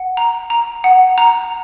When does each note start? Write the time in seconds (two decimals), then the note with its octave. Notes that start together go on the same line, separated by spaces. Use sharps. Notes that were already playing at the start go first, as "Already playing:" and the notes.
Already playing: F#5
0.17 A#5
0.50 A#5
0.84 F#5
1.18 A#5